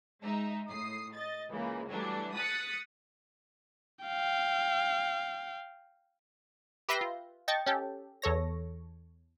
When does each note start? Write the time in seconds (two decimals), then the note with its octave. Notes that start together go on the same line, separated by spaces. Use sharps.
0.21 G#3 D#4 E5
0.69 A2 D#6 C7
1.13 D#5 A6
1.51 C#2 C#3 E3 A#3
1.90 E3 F#3 G3 A3 D4
2.34 D#6 F#6 A6 B6 C#7
4.05 F5 G5
6.89 G4 B4 E5 G6 A#6 C7
7.01 F4
7.48 D#5 G5 A5 C#6 A6
7.66 C#4 G4 A4
8.22 E2 A4 C#5 A#6